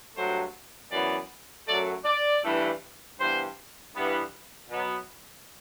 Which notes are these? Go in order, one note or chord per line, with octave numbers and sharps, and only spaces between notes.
G2 F#3 A3 C5
F#2 E3 B3 D5
F#2 F#3 A3 D5
D5
G2 E3 A3
G2 E3 B3 C5
G2 E3 B3
B2 F#3 B3